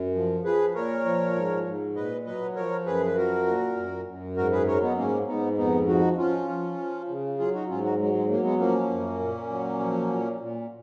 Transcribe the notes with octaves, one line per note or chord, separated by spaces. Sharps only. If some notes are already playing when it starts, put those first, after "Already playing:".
Already playing: F#2
F3
F3 G#4 B4
A#2 A#4 C#5
F3
G#2
G#2
A#2 B4 D#5
F#3 B4 D#5
F3 A#4 C#5
F#2 G#4 B4
B4
F3 F#4 A#4
A#2
F#2
F#2
G#2 F#4 A#4
G#4 B4
F#3 A#4 C#5
B3 D#4
G#2 A#3 C#4
G#2 B3 D#4
F2 B3 D#4
F3 D#4 F#4
F3 C#4 F4
F3
F3
C#3
F#3 F4 G#4
D#4 F#4
G#2 C#4 F4
D#4 F#4
F#3 G#3
G#3
F#3 A#3
G#3 B3
F3 A#3 C#4
F#2
A#2
F#3
F3
A#2
A#2